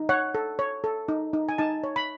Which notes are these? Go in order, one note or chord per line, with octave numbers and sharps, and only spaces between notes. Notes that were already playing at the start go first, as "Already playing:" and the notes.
Already playing: D#4
C#5 F#5
A4
C#5
A4
D#4
D#4
G#5
D#4 A5
C#5
B5